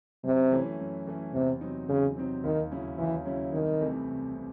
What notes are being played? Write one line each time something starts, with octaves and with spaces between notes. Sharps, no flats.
F#2 C3
E3 A3 C#4 E4
F#2
E3 A3 C#4 E4
E2 C3
C3 F#3 C4 D#4
E2 C#3
C3 F#3 C4 D#4
D#2 D#3
C#3 F#3 C#4 E4
D#2 E3
C#3 F#3 C#4 E4
C2 D#3
C3 E3 A3
C2
C3